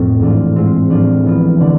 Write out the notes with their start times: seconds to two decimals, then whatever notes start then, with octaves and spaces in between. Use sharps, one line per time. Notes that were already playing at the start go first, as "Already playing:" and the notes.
Already playing: F2 A2 F3 C4
0.20 G#2 E3 G#3 D4 F4
0.56 G#2 G#3 C4 F4
0.90 A2 F3 G#3 D4 F4
1.25 E3 B3 F4
1.60 D3 A3 D4